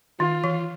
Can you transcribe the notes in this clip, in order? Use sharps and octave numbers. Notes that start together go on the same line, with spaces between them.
D#3 F4
E3